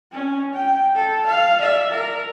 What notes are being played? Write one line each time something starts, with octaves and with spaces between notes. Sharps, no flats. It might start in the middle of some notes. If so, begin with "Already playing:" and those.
C#4
G5
A4
F5
D5 E5
A#4